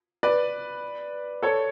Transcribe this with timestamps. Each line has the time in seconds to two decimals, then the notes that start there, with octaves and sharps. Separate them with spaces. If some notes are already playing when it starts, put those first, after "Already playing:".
0.23 B4 D5
1.43 A4 C#5